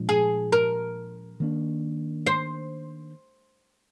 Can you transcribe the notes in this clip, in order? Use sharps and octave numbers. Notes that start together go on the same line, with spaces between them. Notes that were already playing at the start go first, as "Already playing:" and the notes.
Already playing: A#2 F3 G#3 D4
G#4
A#4
D#3 A#3 D4
C5